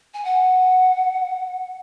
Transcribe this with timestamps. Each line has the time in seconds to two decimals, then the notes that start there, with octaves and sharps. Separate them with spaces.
0.14 G#5
0.25 F#5